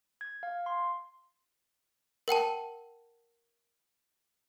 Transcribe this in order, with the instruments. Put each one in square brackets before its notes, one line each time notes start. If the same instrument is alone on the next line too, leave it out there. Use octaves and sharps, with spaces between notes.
[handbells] G#6
F5
C6
[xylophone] A#4 F#5 G5 A5